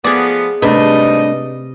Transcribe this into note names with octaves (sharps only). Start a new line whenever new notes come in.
F3 A3 B3 G#4 D5
G#2 C3 G3 A3 D4 B4 D#5